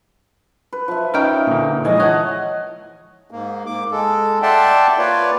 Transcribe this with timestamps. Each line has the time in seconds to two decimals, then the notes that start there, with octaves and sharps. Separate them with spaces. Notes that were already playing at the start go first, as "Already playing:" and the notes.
0.73 B4
0.88 F3 E5
1.14 C#4 D#4 A#4 F5 G5
1.47 A#2 D3
1.85 E3 F3 G#3 D#5 G#5
2.00 C#5 F#5 A5
3.31 G#2 A#3
3.66 G#2 A#3 D6
3.91 G#3 A4
4.42 D5 E5 F#5 G5 A5 C6
4.98 A#3 F4 B4 C#5 D5